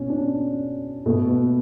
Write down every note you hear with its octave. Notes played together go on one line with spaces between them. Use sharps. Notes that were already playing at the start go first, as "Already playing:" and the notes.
Already playing: B2 C#4
D4
C#4
B2 A3
B3